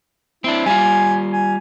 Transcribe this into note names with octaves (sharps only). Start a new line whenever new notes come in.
C4 D4 E4
G3 F4 G#5
G#5